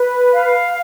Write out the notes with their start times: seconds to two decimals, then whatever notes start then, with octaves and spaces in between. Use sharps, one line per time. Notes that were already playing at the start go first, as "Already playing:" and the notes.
Already playing: B4
0.32 F5